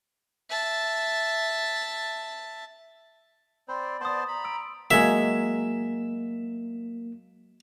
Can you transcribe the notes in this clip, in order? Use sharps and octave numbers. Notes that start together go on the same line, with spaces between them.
E5 A5
C4 C5 D5 B5
B3 C5 A5 C6 D#6
A#5 B5
E6 D7
F#3 G#3 A#3 G#4 E5